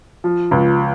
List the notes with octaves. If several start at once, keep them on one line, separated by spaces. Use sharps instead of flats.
F3
C#2